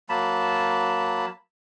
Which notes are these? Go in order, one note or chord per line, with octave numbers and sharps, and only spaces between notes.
F#3 A#3 A5 B5